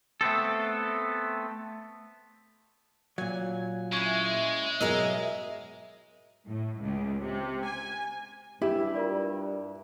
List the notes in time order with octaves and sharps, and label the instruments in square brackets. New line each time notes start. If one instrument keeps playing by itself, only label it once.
[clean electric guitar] A3 B3 C4 A4
[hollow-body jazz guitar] A#2 F#3 [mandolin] G#5
[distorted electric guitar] G#3 [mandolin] C#4 E4
[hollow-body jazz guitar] G#2 B2 F#3 [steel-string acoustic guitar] G#4 A#4 D#5 [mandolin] E5
[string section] A2
C#2
C3
G#5
[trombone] G2 [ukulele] E4 [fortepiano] G4 [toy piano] G#5
[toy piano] F4 A#4 D5